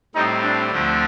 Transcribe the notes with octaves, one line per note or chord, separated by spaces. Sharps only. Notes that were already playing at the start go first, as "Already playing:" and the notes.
A2 G3 C4 D#4
D4
D2 D3 F3 A3 C4